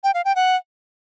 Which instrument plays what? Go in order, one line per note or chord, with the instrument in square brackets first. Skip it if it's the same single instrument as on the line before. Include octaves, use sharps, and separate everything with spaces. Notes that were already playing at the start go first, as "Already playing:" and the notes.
[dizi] G5
F5
G5
F#5